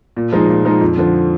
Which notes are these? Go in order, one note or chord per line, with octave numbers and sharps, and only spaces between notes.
A#2
F3 G#3 D#4
A#2
F3 G#3 D#4
F2
D3 F3